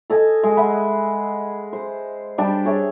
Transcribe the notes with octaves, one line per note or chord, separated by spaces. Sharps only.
A4 D#5 G#5
G#3
B4 E5 F#5
C5
G3 D4 G5 A5
G#4 C#5 E5